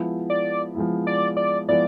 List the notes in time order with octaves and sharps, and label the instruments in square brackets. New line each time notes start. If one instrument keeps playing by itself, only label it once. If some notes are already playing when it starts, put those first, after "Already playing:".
Already playing: [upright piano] F3 G#3 B3 E4
[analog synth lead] D5
[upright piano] F3 G#3 B3 E4
[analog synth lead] D5
D5
[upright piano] F3 G#3 B3 E4 [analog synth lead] D5